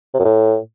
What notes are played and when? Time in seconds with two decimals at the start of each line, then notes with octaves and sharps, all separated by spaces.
0.14 C3
0.19 F#2
0.25 A2